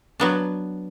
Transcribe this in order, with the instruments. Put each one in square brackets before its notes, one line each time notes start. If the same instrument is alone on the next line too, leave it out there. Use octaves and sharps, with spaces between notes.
[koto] F#3 B3 D4